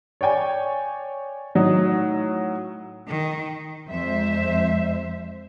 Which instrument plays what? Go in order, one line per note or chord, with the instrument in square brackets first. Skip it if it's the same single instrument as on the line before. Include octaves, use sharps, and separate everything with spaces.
[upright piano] C#5 D5 G5 G#5
A2 F#3 D#4
[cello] D#3
[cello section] F2 G#3 C5 E5